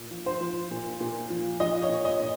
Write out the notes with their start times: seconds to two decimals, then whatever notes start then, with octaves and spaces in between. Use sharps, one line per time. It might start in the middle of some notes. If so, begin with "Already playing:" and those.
Already playing: A#2
0.11 F3
0.26 C5
0.41 F3
0.71 A#2
1.00 A#2
1.30 F3
1.60 F3 D#5
1.82 C#5
1.89 A#2
2.05 D#5
2.20 A#2